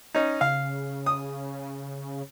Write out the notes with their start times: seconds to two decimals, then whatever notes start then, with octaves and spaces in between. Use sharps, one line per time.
0.15 C#4 D#4
0.41 C#3 F5
1.06 D#6